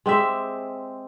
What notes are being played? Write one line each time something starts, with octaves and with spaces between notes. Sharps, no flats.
G#3 C4 G4 E5